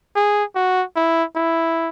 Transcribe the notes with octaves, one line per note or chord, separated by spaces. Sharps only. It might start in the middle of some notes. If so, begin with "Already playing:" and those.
G#4
F#4
E4
E4